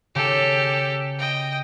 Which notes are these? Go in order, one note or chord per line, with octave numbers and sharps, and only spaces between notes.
C#3 G4 A4
D#5 G5